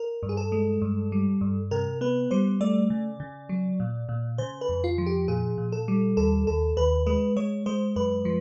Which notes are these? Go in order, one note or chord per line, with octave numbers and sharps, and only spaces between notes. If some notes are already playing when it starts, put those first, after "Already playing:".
Already playing: A#4
G2
G#4
A4
G#3
G2
G3
G2
C3 A#4
B3 B4
G3 C5
A3 D5
C#3
C#3
F#3
A#2
A#2
C#3 C5
B4
F2
F4
F3
G4
A#2 G#4
A#2
A4
G3
D#2 A4
D#2 A4
D#2 B4
G#3 B4
G#3 C#5
G#3 C5
F#2 B4
F3